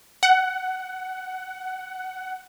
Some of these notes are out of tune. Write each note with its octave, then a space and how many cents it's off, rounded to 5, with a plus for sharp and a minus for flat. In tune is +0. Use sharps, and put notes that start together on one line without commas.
F#5 +15